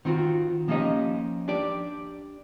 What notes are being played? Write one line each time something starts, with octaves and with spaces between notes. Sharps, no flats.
D#3 C4 F4 F#4
F3 A#3 C#4 D#4 G4 D#5
D4 G4 D5